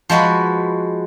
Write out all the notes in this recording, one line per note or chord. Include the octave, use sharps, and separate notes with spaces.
F3 G#3 F#4 B4